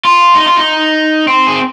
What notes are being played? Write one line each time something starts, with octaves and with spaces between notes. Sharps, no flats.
F4
D#4
F4
D#4
C4
G#4